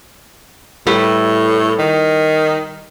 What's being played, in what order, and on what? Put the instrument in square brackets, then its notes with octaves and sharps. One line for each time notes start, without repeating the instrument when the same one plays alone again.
[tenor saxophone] A2 [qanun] G3 E4 B4
[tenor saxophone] D#3